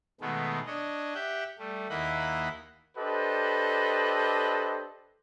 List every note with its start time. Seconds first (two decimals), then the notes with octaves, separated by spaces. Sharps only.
0.21 B2 D#3 G#3 A3 B3
0.67 D4 C#5 D#5
1.14 G4 E5 F#5 G5
1.59 G3 A3
1.90 D#2 A#3 E4 D#5 F#5 B5
2.97 D4 G4 A4 B4 C5 D#5